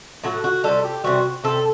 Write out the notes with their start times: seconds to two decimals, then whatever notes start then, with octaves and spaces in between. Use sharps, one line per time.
0.24 A2 F#3 A3 F#4
0.44 F#4
0.64 C3 G3 A4
0.84 G4
1.04 C3 E3 G3 F#4
1.44 C3 G3 A4